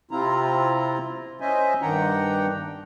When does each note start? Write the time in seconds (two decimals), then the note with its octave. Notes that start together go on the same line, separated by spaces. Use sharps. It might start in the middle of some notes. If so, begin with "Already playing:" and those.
0.11 C3 C4 E4 F4 A#5
1.41 C#4 C5 D#5 E5 G#5
1.82 G2 D#3 D4 F#5 G5 A#5